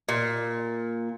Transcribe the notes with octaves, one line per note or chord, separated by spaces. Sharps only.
A#2